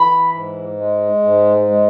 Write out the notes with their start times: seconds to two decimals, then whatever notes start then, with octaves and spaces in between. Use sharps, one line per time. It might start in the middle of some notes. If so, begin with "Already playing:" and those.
Already playing: E3 B5
0.34 G#2
0.79 G#3
1.23 G#2
1.67 G#3